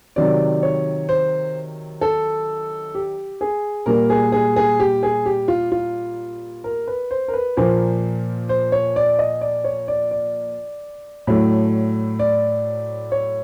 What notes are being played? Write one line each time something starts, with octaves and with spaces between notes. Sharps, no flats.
C3 D#3 F#3 D5
C#5
C5
A4
G4
G#4
A#2 G3 A#3 A#4
G#4
G#4
G#4
G4
G#4
G4
F4
F4
A#4
B4
C5
A#4
B4
A#2 F3 A#3 C5
C5
C#5
D5
D#5
D5
C#5
D5
D5
A2 F#3 A3
D5
C#5